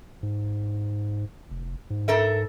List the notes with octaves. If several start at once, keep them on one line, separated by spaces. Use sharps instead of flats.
G#2
F1
G#2
A4 A#4 E5